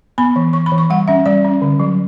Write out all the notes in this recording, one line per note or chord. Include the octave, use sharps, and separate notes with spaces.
B3 B5
E3
E3 C#6
B5
E3
C#6
G3 F#5
C#4 E5
G3 D5
C#4
D3
F#3